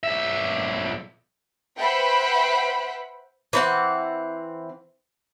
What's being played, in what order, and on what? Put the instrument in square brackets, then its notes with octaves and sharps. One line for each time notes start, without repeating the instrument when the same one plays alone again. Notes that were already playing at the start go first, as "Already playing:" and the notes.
[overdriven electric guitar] B1 E5
[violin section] B4 C5 E5 F#5 G5 B5
[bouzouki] E3 C4 F#5